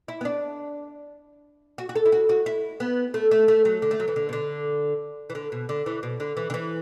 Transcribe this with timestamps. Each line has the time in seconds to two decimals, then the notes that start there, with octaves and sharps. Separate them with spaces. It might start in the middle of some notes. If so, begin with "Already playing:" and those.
0.08 E4
0.21 B3
0.25 D4
1.78 F#4
1.89 F#4
1.96 A4
2.06 E4
2.12 F#4
2.29 F#4
2.46 E4
2.80 B3
3.14 A3
3.31 A3
3.48 A3
3.65 F#3
3.82 D3
3.91 A3
4.00 F#3
4.08 E3
4.16 D3
4.29 B2
4.33 D3
5.30 E3
5.35 D3
5.52 B2
5.69 D3
5.86 E3
6.03 B2
6.20 D3
6.37 E3
6.50 D3
6.54 E3